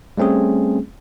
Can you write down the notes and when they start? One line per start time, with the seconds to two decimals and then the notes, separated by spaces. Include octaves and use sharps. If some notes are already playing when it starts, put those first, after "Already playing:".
0.18 G3 A3 C4 C#4 G#4